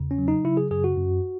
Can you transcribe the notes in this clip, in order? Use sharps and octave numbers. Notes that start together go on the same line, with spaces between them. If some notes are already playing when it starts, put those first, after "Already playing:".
Already playing: E2 C#3
C#4
F#3
D#4
C#3 E4
G#4
F#2 G#4
F#4
F#2